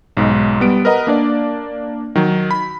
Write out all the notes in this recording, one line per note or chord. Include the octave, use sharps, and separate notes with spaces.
B1 G#2 G#3
G3 B3 D7
A#4 B4 D#5 F#5 A#5
A#3 D4 D5
D#3 F#3
B5